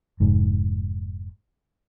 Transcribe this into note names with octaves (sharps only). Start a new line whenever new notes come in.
F1 G#2